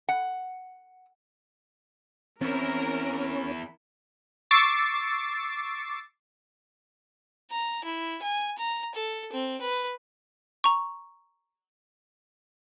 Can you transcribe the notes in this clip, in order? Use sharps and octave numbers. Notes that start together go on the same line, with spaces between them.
F#5
E2 C4 C#4 E4 A#4
C#6 D6 E6 A6 C7
A#5
E4
G#5
A#5
A4
C4
B4
A#5 C#6